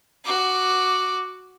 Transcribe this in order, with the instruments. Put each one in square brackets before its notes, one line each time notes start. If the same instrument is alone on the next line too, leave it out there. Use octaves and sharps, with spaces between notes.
[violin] F#4 D6